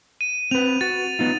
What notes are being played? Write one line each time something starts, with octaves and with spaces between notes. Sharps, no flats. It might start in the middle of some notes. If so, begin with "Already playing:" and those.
D#7
C4 B4 F7
F#4 A6
B3 D#4 F4